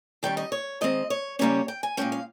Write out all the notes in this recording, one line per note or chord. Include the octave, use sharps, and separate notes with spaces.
D#3 G3 C#4 G5
D#5
C#5
D#3 G#3 C4 D#5
C#5
C#3 G3 A#3 C#4 C#5
G5
G#5
A#2 G#3 C#4 G5
F5